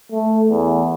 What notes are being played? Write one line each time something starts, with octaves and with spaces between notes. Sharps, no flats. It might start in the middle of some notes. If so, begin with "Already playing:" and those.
A3
E2